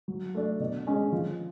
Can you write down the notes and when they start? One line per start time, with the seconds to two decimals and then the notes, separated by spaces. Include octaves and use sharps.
0.08 F#3
0.35 A3 D4
0.60 B2
0.87 G#3 C#4
1.12 F3